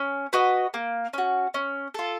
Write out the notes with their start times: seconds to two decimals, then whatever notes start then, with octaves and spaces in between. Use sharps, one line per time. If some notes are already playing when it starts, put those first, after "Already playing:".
Already playing: C#4
0.33 F#4 B4 D#5
0.74 A#3
1.14 C#4 F#4
1.54 C#4
1.94 F4 A4